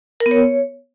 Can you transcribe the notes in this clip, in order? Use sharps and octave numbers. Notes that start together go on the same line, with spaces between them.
A#4
B3
C#5